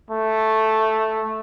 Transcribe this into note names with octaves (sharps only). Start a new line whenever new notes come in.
A3